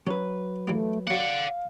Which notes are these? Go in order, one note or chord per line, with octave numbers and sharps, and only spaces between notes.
F#3 C#4 B4
E3 G3 A3 A#3
F#3 A#3 D5 F5 F#5